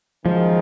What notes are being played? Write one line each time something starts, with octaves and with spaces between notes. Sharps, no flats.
F#2 D#3 F3 G#3